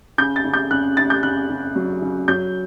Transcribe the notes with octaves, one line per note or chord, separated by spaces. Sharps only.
C#3 G6
A6
C#3
G6
C#3 F#6
C#3 A6
G6
C#3 F#6
C#3
F#3
C#3
F#3 G6